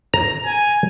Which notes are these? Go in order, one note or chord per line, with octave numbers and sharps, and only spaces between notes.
A#5
G#5